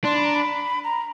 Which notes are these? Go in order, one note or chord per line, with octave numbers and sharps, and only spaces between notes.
D4 C6
B5
A#5
B5
A#5